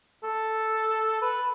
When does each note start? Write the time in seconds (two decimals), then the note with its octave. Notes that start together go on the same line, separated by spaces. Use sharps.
0.23 A4
1.21 B4